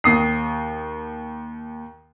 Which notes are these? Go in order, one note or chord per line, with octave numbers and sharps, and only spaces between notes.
D#2 D#6 C7